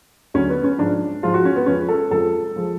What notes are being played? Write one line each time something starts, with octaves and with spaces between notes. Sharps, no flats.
D2 D3 F#3 C#4
B3
C#4
G#2 F3 G#3 D4
G#2 F3 G#3 F4
F#4
C#4
B3
F2 F3 G#3 C#4
A4
F2 F3 G#3 A4
F3 G#3